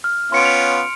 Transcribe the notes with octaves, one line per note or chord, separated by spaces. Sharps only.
F6
B3 C#4 F4 C6 C#7 D7
F7